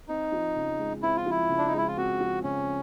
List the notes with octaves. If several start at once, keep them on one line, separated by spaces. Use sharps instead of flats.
C4 D#4
F3
C#3
G#3
C4 E4
F4
F3 E4
C#3
D4
D#4
G#3 E4
F4
C4 F#4
F3
C#3 C#4